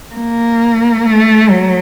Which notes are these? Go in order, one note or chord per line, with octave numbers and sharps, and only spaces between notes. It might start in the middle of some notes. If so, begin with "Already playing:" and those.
A#3
A3
F#3